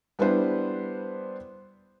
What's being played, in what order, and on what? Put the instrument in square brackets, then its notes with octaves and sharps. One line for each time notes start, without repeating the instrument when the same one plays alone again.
[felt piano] G3 B3 D4 E4 B4 C5